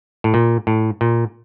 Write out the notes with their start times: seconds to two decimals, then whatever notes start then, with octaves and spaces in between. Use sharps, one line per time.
0.24 A2
0.34 A#2
0.67 A2
1.01 A#2